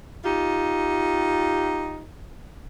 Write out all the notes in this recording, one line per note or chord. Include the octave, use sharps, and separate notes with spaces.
D#4 F4 G4